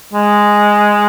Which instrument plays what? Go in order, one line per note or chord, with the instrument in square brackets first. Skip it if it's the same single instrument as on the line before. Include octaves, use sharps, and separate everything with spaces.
[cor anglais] G#3